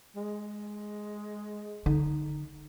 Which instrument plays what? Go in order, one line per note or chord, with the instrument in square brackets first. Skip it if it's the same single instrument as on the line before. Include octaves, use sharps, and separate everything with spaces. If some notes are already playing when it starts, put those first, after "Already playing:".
[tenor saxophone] G#3
[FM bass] D3 [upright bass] D#4